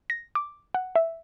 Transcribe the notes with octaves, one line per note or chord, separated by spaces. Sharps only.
A#6
D6
F#5
E5